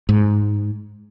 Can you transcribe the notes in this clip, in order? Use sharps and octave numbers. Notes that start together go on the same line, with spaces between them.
G#2